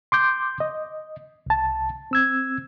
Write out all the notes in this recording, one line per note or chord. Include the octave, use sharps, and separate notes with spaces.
C6 D6 G6
D#5
C2 A5
C4 E6 G#6